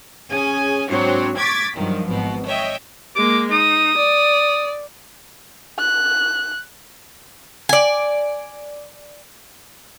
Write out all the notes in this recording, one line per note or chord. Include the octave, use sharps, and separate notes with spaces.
C#4 G#4 G#5
G#2 F#3 C4 D4 C#5
C#6 D6 G#6 A6 B6
G2 D#3 F3 F#3
G#1 B2
C#5 D#5 E5 G5
G#3 A#3 D6
D#4 D#6
D5
F#6
D5 G#5